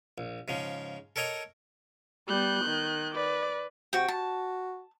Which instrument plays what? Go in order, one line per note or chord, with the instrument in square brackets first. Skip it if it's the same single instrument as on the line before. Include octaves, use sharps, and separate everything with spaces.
[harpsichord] A#1
G#2 C#3 F3
A4 A#4 C#5 D#5 A#5
[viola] G3 B3 [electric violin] F#6 G6
[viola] D#3
[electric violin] B4 [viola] D5
[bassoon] C3 [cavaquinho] F#4 G5
[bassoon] F#4 [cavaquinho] A5